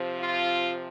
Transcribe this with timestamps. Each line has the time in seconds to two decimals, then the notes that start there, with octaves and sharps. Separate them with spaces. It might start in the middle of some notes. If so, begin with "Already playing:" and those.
Already playing: C3 F3
0.20 F4